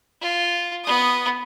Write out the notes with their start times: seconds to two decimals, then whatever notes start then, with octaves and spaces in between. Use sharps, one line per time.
0.21 F4
0.84 B3 D#6